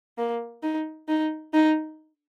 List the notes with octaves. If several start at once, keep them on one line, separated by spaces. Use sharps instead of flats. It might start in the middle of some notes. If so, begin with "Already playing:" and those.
A#3
D#4
D#4
D#4